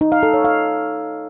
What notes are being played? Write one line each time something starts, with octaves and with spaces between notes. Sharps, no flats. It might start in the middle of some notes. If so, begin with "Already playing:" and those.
D#4
F5
A4
C#5
F5